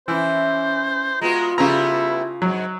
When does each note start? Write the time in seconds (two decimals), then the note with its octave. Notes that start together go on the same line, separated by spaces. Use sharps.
0.08 E3 C#4 E4 C5
1.21 G#3 B3 F4 F#4 A#5
1.58 C#3 G3 A3 B3 E4 A#5
2.42 G#2 F#3